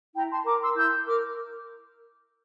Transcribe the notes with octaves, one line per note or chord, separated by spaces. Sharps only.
E4 G5 A#5
A5 C6
A#4 A#5 D6
C6 E6
E4 E6 G6
A#4 D6 F6